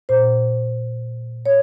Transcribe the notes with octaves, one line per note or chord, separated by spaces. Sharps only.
A#2 C5
C#5